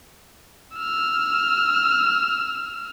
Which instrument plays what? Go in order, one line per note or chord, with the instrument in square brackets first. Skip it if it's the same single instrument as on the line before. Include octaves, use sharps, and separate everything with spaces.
[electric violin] E6 F6